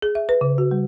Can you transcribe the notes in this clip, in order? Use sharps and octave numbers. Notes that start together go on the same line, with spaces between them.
G#4
E5
B4
C#3
F#4
G3